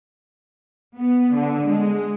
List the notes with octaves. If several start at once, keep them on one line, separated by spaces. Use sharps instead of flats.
B3
D3
G#3